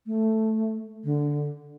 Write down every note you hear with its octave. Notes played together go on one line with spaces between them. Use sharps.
A3
D3